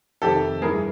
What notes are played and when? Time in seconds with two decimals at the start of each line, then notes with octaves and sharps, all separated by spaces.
0.22 F2 C3 D#3 G4 A4
0.62 G2 E3 G#4 A#4